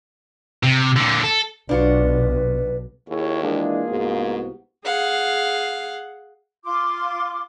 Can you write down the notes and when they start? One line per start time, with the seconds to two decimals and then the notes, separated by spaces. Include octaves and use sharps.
0.63 C3
0.96 A#2 D3
1.24 A4
1.69 B1 D4 F4 F#4 B4
3.08 D#2 E4 G#4 C#5
3.42 E3 G#3 A#3 D4 F4 G#4
3.89 C2 G#2 B3 F#4
4.84 G#4 F5 F#5
6.64 F4 C6 D6